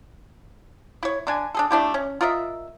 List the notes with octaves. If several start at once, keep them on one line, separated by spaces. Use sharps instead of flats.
E4 C#5
D3 D4 G#5
D4 G#4 A4
A3 D4 E4 G4
C#4
F4 A#4 D#5 E5